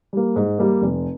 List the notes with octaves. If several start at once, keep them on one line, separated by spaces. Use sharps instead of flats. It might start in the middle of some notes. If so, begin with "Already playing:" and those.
G3 A#3
G#2
G3 A#3
F1